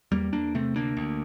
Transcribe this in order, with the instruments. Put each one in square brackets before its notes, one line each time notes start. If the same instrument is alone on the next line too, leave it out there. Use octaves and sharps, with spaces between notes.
[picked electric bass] E2 G3 A#3
E2 A#3 D4
C3 A3 C4
D2 A#3 D4
D2